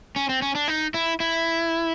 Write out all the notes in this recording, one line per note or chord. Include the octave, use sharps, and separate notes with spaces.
C#4
C4
C#4
D4
D#4
E4
E4